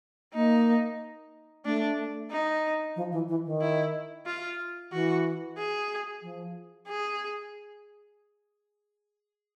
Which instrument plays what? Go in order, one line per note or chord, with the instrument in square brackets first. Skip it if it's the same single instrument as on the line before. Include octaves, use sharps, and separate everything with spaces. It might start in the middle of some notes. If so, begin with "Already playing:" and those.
[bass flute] A#3 [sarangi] D#4
[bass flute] A3 [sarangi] D4
[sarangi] D#4
[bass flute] F3
E3
E3
D#3
[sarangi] E4
F4
[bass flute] E3 [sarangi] F#4
[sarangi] G#4
[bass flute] F3
[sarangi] G#4